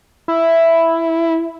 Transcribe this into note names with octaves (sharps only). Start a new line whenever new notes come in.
E4